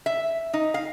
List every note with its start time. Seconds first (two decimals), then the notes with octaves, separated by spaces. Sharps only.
0.06 E5
0.54 D#4
0.74 F5